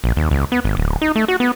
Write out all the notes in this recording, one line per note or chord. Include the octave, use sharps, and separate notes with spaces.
A#1
D#2
C#2
B3
G#1
D1
D#4
A3
F#4
B3